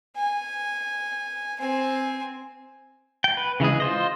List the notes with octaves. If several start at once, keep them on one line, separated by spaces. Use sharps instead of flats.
G#5
C4 G#5
G5
B4
C#3 E3 G#3 G#4
F4 C5 D#5